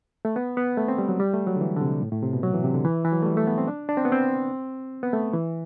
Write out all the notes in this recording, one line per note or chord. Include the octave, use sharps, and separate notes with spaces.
A3
B3
B3
A3
C4
G3
F#3
G3
A3
F#3
D3
E3
D3
C3
A2
A2
C3
B2
F#3
E3
C3
D3
E3
E3
F#3
A3
G3
A3
B3
C4
D4
D4
C4
B3
C4
B3
A3
E3